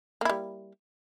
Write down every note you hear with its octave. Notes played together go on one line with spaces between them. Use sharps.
G3 A#3 E4